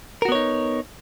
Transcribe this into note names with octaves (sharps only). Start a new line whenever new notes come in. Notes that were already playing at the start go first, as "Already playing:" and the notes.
B3 D#4 F#4 A#4 C#5